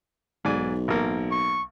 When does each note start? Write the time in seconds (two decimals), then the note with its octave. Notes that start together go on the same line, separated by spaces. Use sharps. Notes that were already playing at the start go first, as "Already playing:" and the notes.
0.45 B1 G#2 D5 G#5
0.88 A1 A#3
1.31 C#6